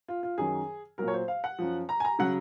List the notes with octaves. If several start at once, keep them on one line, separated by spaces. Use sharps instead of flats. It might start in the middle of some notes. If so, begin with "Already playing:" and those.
F4
F4
F#2 D#3 F#3 G#4
A#2 F#3 A#4
C#5
C5
F5
F#5
F#2 F3
A#5
G#5
A#5
C#3 F#3 F#5